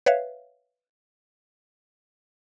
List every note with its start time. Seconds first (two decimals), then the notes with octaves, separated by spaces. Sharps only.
0.06 B4 C#5 E5 F5